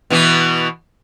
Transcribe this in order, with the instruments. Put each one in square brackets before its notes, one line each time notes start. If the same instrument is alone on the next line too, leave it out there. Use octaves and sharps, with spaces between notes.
[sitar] B2 E3 B3